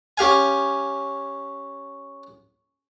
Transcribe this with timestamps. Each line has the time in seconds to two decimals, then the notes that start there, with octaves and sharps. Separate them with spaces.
0.18 C#4 G4 F5 G#5